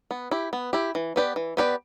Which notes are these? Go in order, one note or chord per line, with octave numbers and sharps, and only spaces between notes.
B3
E4 G4
B3
E4 G4
E3
B3 G4 B4 D5
E3
B3 G4 B4 D5